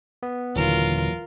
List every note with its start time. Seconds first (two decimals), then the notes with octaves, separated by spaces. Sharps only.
0.23 B3
0.56 D#1 D#2 D3 E3 F#3 F4 A#4